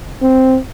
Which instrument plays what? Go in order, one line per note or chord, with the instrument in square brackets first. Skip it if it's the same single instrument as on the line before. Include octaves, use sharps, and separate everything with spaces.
[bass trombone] C4